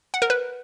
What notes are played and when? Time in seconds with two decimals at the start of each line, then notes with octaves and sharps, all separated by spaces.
0.14 F#5
0.22 A#4
0.30 B4